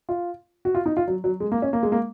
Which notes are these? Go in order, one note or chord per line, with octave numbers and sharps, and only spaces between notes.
F4
F#4
F4
D#4
F4
F#3
F#3
G#3
A#3
C#4
A#3
G#3
A#3